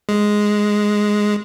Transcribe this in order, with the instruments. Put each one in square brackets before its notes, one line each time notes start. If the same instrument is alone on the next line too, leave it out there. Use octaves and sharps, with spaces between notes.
[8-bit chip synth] G#3